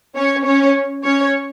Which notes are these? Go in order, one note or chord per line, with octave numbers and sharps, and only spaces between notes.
C#4 C#5
C#4 C#5
C#4 C#5